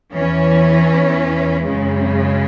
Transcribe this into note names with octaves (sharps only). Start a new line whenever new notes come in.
E2 E3 C#4
F#2 C#3 G#3